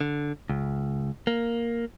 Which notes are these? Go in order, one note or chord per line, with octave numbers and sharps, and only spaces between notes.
D3
C#2
A#3